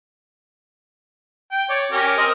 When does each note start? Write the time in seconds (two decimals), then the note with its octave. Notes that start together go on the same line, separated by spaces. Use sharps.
1.52 G5
1.70 C#5 D5
1.92 C#4 G4 A#4
2.18 C4 A#4 D#5